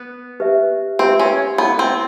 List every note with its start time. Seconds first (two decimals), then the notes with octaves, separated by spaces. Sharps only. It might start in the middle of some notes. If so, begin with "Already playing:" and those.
Already playing: B3
0.40 G4 B4 E5
0.99 C4 G4 B4 E5
1.20 C#4
1.58 B3 E4 A4 C#5 F#5
1.79 C4